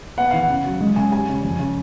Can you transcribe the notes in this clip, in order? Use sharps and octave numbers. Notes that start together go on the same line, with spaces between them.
B3 F#5
E3 F5
F#5
C#3
F#3
G#3
C#3 G#5
G3 G#5
C#3
F2
C#3